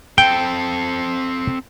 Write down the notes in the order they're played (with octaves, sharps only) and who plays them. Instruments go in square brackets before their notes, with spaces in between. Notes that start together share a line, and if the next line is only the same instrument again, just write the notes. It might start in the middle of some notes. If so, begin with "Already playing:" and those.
[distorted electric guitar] C4 A4 [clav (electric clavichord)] G5